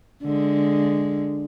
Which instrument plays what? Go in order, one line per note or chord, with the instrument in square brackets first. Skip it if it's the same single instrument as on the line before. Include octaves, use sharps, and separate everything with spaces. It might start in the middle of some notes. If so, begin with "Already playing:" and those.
[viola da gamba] D3 G#3